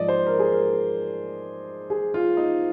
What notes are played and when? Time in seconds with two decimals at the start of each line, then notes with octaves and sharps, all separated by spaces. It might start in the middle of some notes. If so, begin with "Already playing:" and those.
Already playing: G#2 F3 D5 D#5
0.08 C5
0.26 A#4
0.39 G#4
0.52 A#4
1.90 G#4
2.14 F4
2.37 D#4